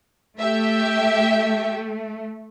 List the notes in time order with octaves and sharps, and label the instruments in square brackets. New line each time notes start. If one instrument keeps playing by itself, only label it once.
[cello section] A3 [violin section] G4 E5